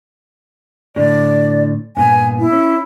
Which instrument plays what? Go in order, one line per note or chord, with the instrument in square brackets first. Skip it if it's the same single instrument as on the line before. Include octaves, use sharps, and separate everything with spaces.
[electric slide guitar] A2 D3 [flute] D5
[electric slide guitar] G2 A#2 B3 [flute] G#5
[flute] E4
[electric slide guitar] C#4